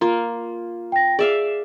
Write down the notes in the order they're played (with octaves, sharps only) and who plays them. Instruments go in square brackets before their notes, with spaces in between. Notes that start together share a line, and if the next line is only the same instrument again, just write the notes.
[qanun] A#3 F4
[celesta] G5 A#6
[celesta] G#4 [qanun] D5 E5 F5